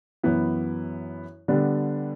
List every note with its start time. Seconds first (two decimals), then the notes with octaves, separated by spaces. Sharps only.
0.23 F#2 E3 B3 E4
1.48 D3 G3 B3 D4 A4